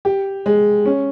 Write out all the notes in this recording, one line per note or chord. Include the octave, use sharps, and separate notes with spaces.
G4
G#3
C#4